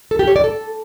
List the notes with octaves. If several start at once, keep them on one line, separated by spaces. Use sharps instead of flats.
A4
G4
C#5
D5
A4